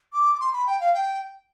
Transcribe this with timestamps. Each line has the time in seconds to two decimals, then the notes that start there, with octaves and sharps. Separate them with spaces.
0.13 D6
0.35 D6
0.40 C6
0.53 B5
0.67 G5
0.80 F5
0.94 G5